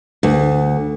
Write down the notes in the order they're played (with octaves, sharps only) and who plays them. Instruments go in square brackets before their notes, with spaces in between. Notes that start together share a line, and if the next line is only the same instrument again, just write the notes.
[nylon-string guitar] D2